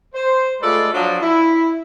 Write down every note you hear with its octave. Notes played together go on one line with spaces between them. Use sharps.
C5
G#3 A3 F4 A4 B4 D5
F3 F#3 D4
E4